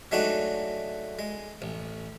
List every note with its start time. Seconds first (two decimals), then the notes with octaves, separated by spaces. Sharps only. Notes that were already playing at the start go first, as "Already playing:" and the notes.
0.11 F#3 G#3 A3 D4 D#4 F#4
1.19 G#3
1.62 A1